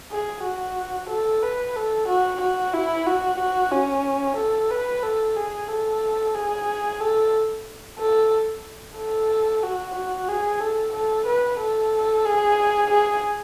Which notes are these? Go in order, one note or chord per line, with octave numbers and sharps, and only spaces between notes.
G#4
F#4
A4
B4
A4
F#4
F#4
E4
F#4
F#4
C#4
A4
B4
A4
G#4
A4
G#4
A4
A4
A4
F#4
F#4
G#4
A4
A4
B4
A4
G#4
G#4